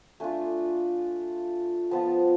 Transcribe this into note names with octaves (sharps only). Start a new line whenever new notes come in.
A3 D4 F4 G#5
F3 B3 F4 A5